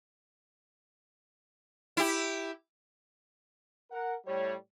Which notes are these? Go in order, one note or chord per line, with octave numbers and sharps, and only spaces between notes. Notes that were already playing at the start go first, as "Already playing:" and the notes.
E4 G4
A#4 F#5
A2 G3 C#5